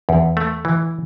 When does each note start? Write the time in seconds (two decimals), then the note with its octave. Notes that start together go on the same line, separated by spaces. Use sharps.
0.09 E2
0.37 A3
0.65 E3